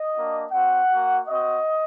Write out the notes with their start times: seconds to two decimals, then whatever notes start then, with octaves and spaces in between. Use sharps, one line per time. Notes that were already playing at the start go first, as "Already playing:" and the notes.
Already playing: D#5
0.14 A#3 D4 F#4
0.52 C4 F#4 F#5
0.90 A#3 F#4
1.28 C4 F#4 D#5